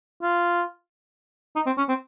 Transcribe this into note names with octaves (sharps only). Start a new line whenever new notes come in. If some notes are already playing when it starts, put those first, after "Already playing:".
F4
D#4
C4
C#4
C4